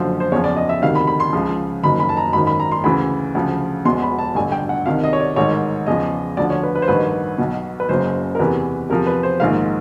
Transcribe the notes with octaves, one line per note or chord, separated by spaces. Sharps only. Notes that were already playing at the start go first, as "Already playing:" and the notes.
Already playing: F#1 F#2 D3 F3 C5
C5
E2 C#3 F3 C#5
D5
D#5
E5
D2 C3 D#3 F5
B5
B5
C6
C#2 C#3 F3
F#1 F#2 D#3 B5
B5
A5
A#5
G#1 F#2 D#3 B5
B5
A#5
C6
D2 C#3 E3 B5
D2 C#3 F3
E1 E2 B2 C6
B5
A5
A1 G2 D3 G#5
G5
F#5
C2 C3 D#3 F5
D#5
C#5
D5
A1 G#2 D#3 C#5
E2 C#3 F3 D#5
D2 D3 F3 D5
C#5
B4
B4
C5
A1 G2 D#3 B4
B1 B2
B4
F#1 F#2 C#3 C5
A#4
E2 C3 E3 B4
E2 C3 F3 A#4
B4
C5
A#1 G#2 D#3 F5